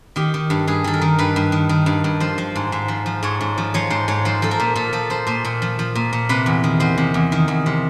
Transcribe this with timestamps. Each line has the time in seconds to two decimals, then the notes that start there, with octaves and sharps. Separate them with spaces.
0.16 D#3 G4
0.34 D#3
0.50 G2
0.67 G2 G#4
0.84 D#3 A4
0.94 A#4
1.01 D#3
1.19 G2 B4
1.36 G2
1.52 D#3
1.69 D#3
1.86 G2
2.04 G2
2.20 F3 C5
2.38 F3
2.55 G#2
2.72 G#2
2.88 F3
3.06 F3
3.23 G#2 C#5
3.41 G#2
3.58 F3
3.74 F3 C#5
3.90 G#2 C5
4.08 G#2 C#5
4.25 F3 C5
4.42 F3 A4
4.51 A#4
4.60 A#2
4.75 A#2 A4
4.93 F3 A4
5.10 F3 C5
5.27 A#2 C5
5.45 A#2
5.62 F3
5.79 F3
5.95 A#2
6.13 A#2
6.29 C3 B4
6.46 E2
6.64 D#3
6.80 E2 C5
6.98 C3
7.14 E2
7.32 D#3
7.48 E2
7.66 C3